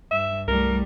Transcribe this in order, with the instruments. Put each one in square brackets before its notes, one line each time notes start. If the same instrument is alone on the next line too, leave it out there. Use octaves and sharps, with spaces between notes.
[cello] G2 [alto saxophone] E5
[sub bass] C2 [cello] G3 A3 [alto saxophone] A#4